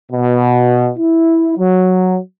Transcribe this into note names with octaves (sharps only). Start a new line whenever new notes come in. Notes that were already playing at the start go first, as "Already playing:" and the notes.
B2
E4
F#3